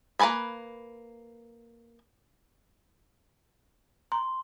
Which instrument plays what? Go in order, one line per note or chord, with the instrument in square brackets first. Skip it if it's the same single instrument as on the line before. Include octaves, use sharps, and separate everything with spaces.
[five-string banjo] A#3 A#4 B4 G#5 B5
[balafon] A#5 [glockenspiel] C6